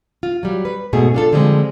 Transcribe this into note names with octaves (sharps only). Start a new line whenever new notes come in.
F4
F#3 G3
B4
G#2 B2 A3 G#4
D4 F4 A4
D3 F3 G3 G#3 C4